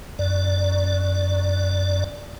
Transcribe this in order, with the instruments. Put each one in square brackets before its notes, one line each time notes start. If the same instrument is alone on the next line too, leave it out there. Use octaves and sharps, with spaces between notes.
[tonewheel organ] F#2 D5